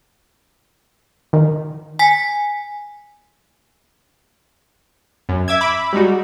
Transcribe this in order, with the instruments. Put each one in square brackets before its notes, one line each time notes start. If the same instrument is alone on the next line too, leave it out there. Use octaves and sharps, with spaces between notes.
[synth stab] D#3
[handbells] G#5 B6
[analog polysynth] F#2
E5 D6 E6 G#6
B5 D6 E6
G3 G#3 D#4 F#4